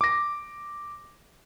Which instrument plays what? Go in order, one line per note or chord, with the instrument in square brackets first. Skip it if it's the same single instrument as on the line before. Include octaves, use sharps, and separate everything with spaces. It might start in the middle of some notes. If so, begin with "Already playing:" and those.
[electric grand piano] D6 A#6